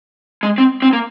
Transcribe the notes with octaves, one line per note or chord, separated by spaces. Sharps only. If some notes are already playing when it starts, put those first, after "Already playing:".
G#3
C4
C4
A#3